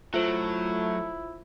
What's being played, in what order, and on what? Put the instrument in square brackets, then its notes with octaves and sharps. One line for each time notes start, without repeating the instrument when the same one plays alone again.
[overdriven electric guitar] F#3 [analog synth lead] A3 [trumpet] E4 [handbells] F4 C5